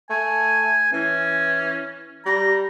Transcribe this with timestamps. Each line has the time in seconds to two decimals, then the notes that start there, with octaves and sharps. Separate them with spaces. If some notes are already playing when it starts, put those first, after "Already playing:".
0.10 A3 G#5
0.93 E3 C#4
2.26 G3 A#5